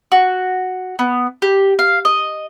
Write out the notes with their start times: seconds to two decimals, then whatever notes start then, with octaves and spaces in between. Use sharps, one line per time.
0.12 F#4
0.99 B3
1.42 G4
1.79 F5
2.05 D#5